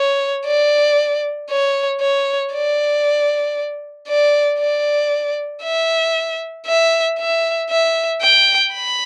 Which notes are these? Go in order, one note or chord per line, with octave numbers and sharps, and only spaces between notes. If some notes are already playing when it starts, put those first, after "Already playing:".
Already playing: C#5
D5
C#5
C#5
D5
D5
D5
E5
E5
E5
E5
G5
B5